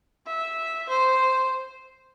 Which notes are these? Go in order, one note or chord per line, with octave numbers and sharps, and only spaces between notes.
E5
C5